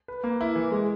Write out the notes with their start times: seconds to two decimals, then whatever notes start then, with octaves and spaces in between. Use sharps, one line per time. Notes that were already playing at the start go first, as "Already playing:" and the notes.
0.08 B4
0.24 A#3
0.41 E4
0.56 E3
0.71 G#3